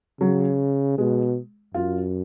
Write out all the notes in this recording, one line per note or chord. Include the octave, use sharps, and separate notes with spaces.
C#3 F#3
B2 G#3
F#2 F4